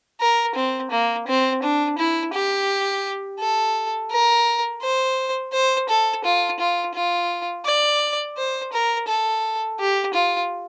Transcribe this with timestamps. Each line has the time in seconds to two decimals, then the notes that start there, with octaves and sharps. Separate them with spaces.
0.21 A#4
0.56 C4
0.91 A#3
1.28 C4
1.63 D4
1.98 E4
2.34 G4
3.40 A4
4.11 A#4
4.82 C5
5.53 C5
5.89 A4
6.25 F4
6.59 F4
6.95 F4
7.65 D5
8.37 C5
8.73 A#4
9.08 A4
9.80 G4
10.14 F4